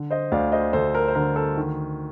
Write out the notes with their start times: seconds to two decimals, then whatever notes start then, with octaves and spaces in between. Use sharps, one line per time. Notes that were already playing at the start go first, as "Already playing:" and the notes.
Already playing: D3
0.11 C5 D#5
0.32 D2 D5 F5
0.52 C5 D#5
0.73 D2 A4 C5
0.95 A#4
1.08 C5
1.15 D3 A#4
1.36 A4 C5
1.57 D#3